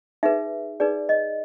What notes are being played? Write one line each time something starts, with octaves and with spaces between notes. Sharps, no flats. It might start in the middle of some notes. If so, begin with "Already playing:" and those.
D#4 G#4 B4 E5
D#4 G#4 B4 D5
D#5